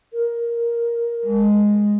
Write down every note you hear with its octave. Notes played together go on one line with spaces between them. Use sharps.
A#4
G#3